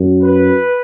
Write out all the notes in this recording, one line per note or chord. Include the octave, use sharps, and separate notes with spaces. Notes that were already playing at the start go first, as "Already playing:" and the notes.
Already playing: F#2
B4